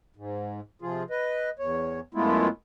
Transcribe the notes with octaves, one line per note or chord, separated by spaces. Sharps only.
G#2
C3 F3 F4 G#4
B4 D#5
E2 C#5
F#2 G#3 A3 B3 E4 F4